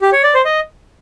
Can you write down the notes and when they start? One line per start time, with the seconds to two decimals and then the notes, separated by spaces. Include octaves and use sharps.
0.02 G4
0.12 C#5
0.23 D5
0.34 C5
0.45 D#5